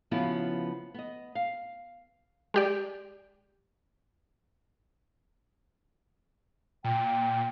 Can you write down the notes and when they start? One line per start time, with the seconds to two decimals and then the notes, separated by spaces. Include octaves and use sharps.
0.11 C#3 F3 B3 E4 F#4 B4
0.94 B3 D#5
1.35 F5
2.54 G#3 G4 D5
6.84 A#2 G5